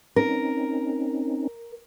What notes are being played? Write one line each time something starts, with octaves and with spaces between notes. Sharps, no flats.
C4 C#4 D#4 A#4